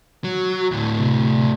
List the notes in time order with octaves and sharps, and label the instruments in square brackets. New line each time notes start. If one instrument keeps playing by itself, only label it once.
[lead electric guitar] F#3
D2 A2
[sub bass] C3